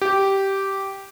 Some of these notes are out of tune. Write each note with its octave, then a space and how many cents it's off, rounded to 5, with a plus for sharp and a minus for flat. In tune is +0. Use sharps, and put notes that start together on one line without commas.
G4 -10